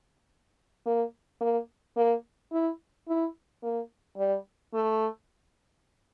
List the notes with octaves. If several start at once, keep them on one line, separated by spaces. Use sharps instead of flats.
A#3
A#3
A#3
E4
E4
A#3
G3
A3